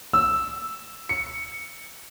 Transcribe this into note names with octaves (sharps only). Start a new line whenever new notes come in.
E6
C#7